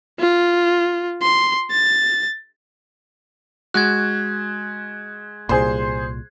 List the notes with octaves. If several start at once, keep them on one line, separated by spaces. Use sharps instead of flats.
F4
C6
A6
G#3 F#4 F#6 G#6
C2 A#2 G#4 C5 C6